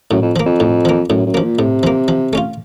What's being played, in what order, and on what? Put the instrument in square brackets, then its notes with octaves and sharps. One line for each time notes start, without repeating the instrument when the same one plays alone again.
[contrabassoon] F#2 [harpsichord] A2
[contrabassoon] F2
[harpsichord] F3 A#3
[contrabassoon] F2
[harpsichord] A2
F3 A#3
[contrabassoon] F#2 [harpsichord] A2
[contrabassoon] F#2
[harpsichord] F3 A#3
[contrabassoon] A#2
[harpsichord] A2 [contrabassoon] C3
[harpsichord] F3 A#3
F3
A3 C#4 F4